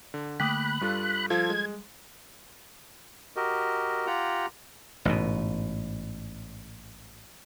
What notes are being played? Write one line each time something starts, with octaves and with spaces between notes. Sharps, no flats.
D3
D3 A3 A#3 G5 B5 D6 D#6 F#6
G2 G3 F4 A4
F3 F4 A4 G#6
G#3
F#4 G4 A#4 D#5
F4 G4 F#5 G5 A#5
A1 G#2 B2